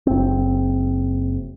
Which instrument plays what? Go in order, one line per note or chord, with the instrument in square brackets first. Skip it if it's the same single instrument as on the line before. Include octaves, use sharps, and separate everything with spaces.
[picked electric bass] F#1 C4